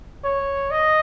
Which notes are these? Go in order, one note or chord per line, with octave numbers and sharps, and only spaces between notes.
C#5
D#5